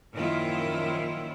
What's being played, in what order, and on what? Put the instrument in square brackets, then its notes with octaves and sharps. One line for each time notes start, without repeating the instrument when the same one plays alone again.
[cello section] F#2 A#2 D#3 F3 E4 F4